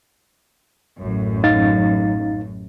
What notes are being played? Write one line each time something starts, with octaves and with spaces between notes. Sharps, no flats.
A1 F#2
D#4 F5 A6